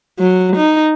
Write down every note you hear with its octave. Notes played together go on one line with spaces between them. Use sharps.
F#3
D#4